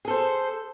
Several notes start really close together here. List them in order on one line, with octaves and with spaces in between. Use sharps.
G#4 A4 C5